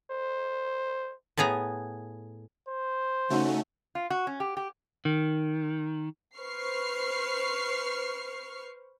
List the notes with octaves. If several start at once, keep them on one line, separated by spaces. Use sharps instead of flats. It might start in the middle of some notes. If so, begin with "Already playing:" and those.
C5
A2 B3 G#4 G#5 A#5
C5
C#3 A3 C#4 D#4 F#4
F4
F#4
C#4
G4
G4
D#3
B4 C5 C#6 F6 C7